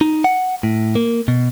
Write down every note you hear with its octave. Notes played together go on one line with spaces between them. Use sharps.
D#4
F#5
A2
A#3
B2